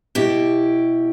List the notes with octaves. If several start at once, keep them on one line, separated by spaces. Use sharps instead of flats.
B2 E4 G4